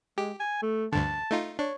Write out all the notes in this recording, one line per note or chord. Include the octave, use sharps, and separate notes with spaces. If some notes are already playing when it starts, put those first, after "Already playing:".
G#3 G4
G#5
A3
D2 G2 D3 A5
A3 D#4 F4
D4 C#5